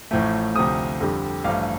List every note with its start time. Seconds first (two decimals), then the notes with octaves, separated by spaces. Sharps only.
0.11 A1 A2 F3 A3
0.55 D2 C3 F3 A3 D#6
1.00 F2 D3 G3
1.44 A1 G2 F3 A3 F5